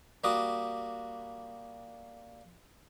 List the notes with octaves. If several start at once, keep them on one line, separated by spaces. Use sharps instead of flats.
G3 A#3 F#4 D6 D#6